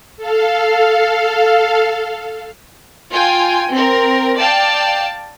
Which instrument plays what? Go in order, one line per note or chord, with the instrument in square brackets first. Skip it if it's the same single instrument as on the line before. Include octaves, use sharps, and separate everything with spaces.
[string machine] A4 F5
[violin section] F4 G5 G#5
C4 A#4
D5 F5 G5 A5